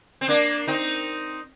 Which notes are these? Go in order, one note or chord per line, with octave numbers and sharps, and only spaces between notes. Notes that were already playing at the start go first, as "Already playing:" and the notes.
C4
A#3 D4
C4 D#4